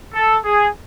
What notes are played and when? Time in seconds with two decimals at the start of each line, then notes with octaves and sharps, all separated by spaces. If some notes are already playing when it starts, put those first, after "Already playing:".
0.14 A4
0.45 G#4